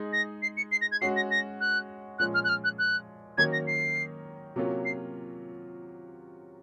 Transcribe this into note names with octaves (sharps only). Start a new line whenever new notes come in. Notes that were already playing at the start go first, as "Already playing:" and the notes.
Already playing: G#3 D#4 G#4
A#6
C7
C#7
C7
A#6
G#6
G#3 C#4 F#4 C7
A#6
A#6
F#6
A#2 F3 G#3 C#4 F#6
F6
F#6
F6
F#6
F#6
D#3 F#3 A#3 C#4 G#6
A#6
C7
C3 F#3 A#3 C#4 F4
C7